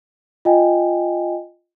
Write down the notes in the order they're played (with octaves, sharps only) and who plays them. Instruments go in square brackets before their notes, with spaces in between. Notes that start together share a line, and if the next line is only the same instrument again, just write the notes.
[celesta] F4 D#5 G5 G#5